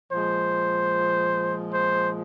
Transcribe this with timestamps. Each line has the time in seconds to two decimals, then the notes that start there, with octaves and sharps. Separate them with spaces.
0.10 A#2 F3 G#3 C5
1.72 C5